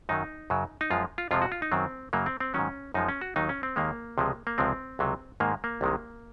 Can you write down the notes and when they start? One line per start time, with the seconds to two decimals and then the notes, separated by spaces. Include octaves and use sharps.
0.09 F#2 D#3 F#3 D#4
0.50 F#2 C#3 F#3
0.81 D#4
0.90 F#2 F3 G#3 F4
1.18 F4
1.31 F2 C3 F3 G#3 F4
1.42 F#4
1.52 F4
1.62 D#4
1.72 F#2 D#3 F#3 C4
2.13 F#2 C#3 F#3 A#3
2.26 C4
2.40 C4
2.54 G#2 D#3 F#3 C#4
2.94 F#2 F3 G#3 D#4
3.08 C#4
3.21 F#4
3.36 D#2 D#3 F#3 D#4
3.49 C#4
3.63 C4
3.76 D#2 D#3 G#3 A#3
4.18 C#2 C3 F3 G#3
4.47 A#3
4.58 C#2 C3 F3 G#3 C4
4.99 C#2 C3 F#3
5.40 G#2 D#3 G#3 A#3
5.64 A#3
5.81 C2 C3 D#3 G#3